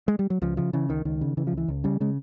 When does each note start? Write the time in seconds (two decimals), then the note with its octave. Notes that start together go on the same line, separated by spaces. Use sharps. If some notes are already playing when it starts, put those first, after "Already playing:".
0.08 G#3
0.19 G3
0.30 F#3
0.42 C#2 F3
0.57 C#3 F3
0.73 C#3 E3
0.89 C#2 D#3
1.05 C#2 D#3
1.21 C#3
1.37 C#3 E3
1.47 F3
1.53 C#2 E3
1.68 C#2
1.84 C#3 G3
2.00 C#3 G#3